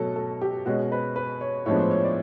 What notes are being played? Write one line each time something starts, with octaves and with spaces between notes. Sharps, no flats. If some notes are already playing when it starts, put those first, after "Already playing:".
Already playing: B2 F#3 A3 C#4 A4
A4
G4
B2 G#3 C#4 F#4
B4
B4
C#5
A2 F3 G#3 B3 D4 C#5
C5
C#5
D5